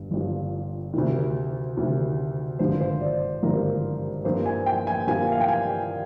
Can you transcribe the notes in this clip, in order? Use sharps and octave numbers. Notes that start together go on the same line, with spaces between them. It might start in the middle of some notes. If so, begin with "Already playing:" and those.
Already playing: G1 G2
G1 G2 F3
D2 C3 D#3
D2 C3 D#3
G#1 G2 D3 F3 C5
C5
D5
G#1 G2 D3 F3 A#4
G2 F3 A#3 C5
G#5
G5
G#5
G2 F3 A#3 G#5
F5
G5
G#5